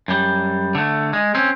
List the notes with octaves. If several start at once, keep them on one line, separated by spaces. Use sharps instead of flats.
F#2 G3
D3 A3
G#3
C4 C#4